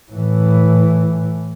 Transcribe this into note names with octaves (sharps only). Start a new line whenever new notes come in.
A2 E3